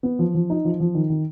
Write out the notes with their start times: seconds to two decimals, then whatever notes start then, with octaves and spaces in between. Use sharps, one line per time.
0.03 B3
0.19 F3
0.35 F3
0.50 D#4
0.65 F3
0.80 F3
0.95 D#3
1.10 D#3